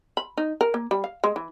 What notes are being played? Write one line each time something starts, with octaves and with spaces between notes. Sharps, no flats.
B5
D#4
A#4
A#3
G3
F5
G#3
E3